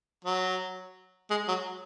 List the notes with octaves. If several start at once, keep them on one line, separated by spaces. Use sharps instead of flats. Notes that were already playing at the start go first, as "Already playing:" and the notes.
F#3
G#3
F#3